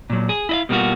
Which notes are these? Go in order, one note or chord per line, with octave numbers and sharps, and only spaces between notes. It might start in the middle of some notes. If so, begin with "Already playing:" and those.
A#2 F#3
G#4
E4 D#5 F5
B2 G3 A#3 C4 F4 F#4